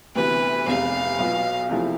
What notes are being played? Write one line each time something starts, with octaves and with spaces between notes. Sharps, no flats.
D2 C3 E3 B3 B4
F1 E2 C3 F5
B1 B2 B3 F4
E2 C3 F3 A3 E4